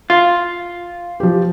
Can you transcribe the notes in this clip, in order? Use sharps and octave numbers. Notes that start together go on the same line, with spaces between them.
F4
F3 G4